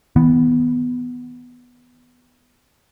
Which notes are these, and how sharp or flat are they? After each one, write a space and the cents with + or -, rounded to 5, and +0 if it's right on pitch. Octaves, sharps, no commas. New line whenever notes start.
E3 -45 B3 +0